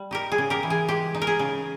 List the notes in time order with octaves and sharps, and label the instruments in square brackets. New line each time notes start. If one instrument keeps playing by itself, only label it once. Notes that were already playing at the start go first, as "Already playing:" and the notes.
Already playing: [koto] G3
D#4 G4 A#4
G#4
C#3
G4 A#4
E3
G#4
G#3 G4
D#4
A#4
G#4
C#3